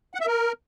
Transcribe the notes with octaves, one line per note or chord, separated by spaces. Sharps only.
F#5
E5
A#4